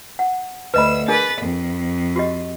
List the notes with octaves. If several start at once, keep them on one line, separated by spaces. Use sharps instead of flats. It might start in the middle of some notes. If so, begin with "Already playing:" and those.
F#5
D2 B4 D#5 B5 E6
D4 G#4 A#4 B4 A6
F2
F#4 G4 D#5